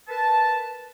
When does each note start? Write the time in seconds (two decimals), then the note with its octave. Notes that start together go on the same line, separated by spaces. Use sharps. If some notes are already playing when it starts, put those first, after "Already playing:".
0.08 A#4 B4 A5